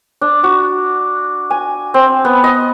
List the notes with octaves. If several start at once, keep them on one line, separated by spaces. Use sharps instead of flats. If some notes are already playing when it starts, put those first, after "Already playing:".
D4
F#4
G#5
C4
B3
D#5